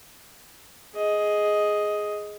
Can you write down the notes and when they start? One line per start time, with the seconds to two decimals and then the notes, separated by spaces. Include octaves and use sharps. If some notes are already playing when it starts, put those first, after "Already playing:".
0.95 G#4 D#5